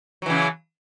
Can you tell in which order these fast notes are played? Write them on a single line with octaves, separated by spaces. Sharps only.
F#3 E3 C#3